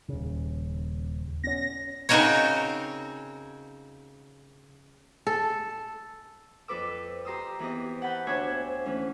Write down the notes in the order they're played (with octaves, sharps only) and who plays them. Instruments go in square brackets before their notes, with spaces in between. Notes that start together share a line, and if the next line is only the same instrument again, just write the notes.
[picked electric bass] D#1 C#3
[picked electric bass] B3 C#4 [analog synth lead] A#6
[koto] C#3 C4 D#4 F#4 A#4 C#5
[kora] A4
[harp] F2 A4 B4 D6 E6
G4 A#5 C6 D#6 E6
E3 B3 C4 G4 D#5
F#5 G5 A5 B5 G6
D2 D4 C5 C#5 E5 G#5
E3 A3 C#4